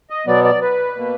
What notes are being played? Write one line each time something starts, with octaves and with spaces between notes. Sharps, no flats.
D#5
B2 F#3 B3 D5
D5
B4
B2 A#3